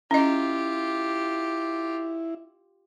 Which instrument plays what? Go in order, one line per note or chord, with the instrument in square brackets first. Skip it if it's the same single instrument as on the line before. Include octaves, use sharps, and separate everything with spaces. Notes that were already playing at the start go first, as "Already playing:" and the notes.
[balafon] C#4 D#5 [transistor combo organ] E4 [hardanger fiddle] F4 G4